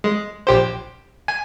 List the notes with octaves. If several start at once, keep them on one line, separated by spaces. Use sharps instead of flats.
G#3
A#1 G4 C5
G#5